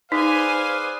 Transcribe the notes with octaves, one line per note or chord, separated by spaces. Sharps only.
D#4 G#4 B4 C5 D5 F5 G#5